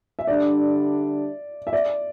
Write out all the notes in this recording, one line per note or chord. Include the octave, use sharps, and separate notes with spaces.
E5
D3 G3 D4 D5
E5
D5